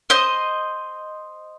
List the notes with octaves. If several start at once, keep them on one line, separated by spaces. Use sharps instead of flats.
C5 D#5